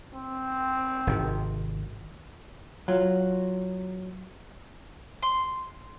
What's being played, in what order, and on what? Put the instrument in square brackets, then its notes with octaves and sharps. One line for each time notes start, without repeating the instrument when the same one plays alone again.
[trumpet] C4
[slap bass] G#1 C3 D#3
[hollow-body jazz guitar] F#3 F4
[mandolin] C6